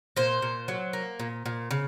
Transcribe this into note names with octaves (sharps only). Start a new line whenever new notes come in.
A#2 C5
A#2
F#3
A#3
A#2
A#2
C#3